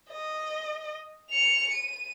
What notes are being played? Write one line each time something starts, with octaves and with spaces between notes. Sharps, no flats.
D#5
C#7 F7
D#7